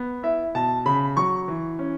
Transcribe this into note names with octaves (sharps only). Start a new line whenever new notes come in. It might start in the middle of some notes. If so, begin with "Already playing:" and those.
Already playing: B3
E4 E5
B2 A5
C#3 B5
F#3 C#6
E3
C#4